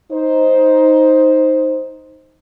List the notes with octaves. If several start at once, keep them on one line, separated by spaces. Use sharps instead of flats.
D#4 C5